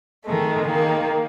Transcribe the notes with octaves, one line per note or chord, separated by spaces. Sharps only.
D#3 G#3 A3
D#3 A#3